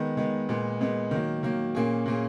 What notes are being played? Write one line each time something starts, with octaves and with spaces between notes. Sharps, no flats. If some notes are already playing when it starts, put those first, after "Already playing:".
Already playing: D#3 G#3 B3
D#3 G#3 B3
A#2 G#3 B3
A#2 G#3 B3
D#3 F#3 A#3
D#3 F#3 A#3
A#2 A#3 C#4 G#4
A#2 A#3 C#4 G#4